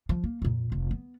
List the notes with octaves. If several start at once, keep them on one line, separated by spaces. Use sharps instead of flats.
F3
A#3
F2 A#2
F1
B3